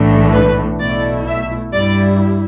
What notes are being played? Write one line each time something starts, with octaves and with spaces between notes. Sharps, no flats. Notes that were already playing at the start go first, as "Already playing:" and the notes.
Already playing: B1 A2 E3 A3 D4
B4
B1 B2 A3 E4 D5
E5
G2 G3 E4 D5